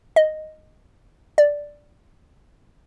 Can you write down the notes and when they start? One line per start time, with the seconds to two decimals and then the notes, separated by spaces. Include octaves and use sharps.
0.16 D#5
1.38 D5